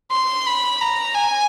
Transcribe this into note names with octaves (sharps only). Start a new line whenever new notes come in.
C6
B5
A#5
G#5